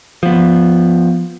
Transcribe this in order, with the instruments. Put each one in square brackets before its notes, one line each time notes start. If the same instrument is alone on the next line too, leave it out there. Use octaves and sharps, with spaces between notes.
[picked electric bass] F3 B3